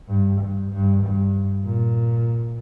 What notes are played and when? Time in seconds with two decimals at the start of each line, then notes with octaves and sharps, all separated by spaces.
0.09 G2
0.41 G2
0.72 G2
1.03 G2
1.65 A#2